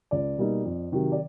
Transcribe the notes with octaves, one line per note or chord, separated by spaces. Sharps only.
C#2 D5
B2 G3 A#3 D#4
F2
C3 D#3 F#3
D5